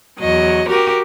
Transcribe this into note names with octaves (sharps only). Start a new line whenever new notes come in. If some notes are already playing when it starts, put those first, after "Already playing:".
E2 F#3 D#5
F#4 G4 A#4